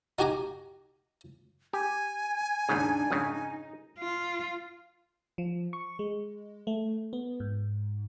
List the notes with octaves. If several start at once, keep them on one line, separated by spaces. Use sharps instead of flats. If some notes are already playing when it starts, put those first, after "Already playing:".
D#4 F#4 G4 G#5 A#5 D6
G4 G#5
D#2 G#2 C#3 D4 D#4
F2 G#2 C#3 D#4
F4
F3
C#6
G#3
A3
B3
G#2